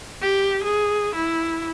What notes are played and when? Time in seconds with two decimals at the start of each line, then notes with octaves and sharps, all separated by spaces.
0.22 G4
0.64 G#4
1.15 E4